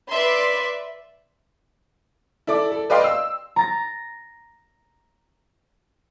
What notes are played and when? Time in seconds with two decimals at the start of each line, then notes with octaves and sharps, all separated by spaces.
0.10 B4 D5 E5 C6
2.47 E4 A4 D5 D6
2.72 A4
2.90 B4 D5 D#5 F5 G5 C6
3.04 E6
3.56 A#5 A6 A#6